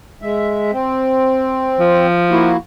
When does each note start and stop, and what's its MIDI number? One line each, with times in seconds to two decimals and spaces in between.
0.22 0.71 56
0.22 0.71 76
0.72 2.07 60
1.79 2.53 53
2.31 2.57 58
2.31 2.57 64
2.31 2.57 66